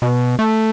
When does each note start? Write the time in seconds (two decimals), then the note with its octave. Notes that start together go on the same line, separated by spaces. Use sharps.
0.02 B2
0.39 A3